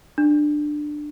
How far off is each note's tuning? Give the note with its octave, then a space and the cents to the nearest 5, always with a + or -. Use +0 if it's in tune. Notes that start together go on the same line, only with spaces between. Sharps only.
D4 +15